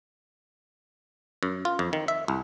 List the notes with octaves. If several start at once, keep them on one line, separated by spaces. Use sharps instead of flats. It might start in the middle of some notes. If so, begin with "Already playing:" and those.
F#2
F4
F2
D#3
E5
C2